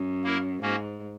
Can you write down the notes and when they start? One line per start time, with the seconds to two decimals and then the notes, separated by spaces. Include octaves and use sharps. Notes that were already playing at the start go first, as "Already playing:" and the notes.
Already playing: F#2
0.24 A#3 E4 A#4
0.63 G#2 A#3 C#4 F#4